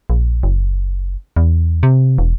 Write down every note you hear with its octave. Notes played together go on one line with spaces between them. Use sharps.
A#1
F#1
E2
C3
E1